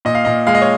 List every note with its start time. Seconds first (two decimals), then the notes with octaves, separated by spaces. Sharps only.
0.05 A#2 D#5
0.15 F5
0.25 A#2 D#5
0.47 G#3 F5
0.55 D#5
0.62 C#5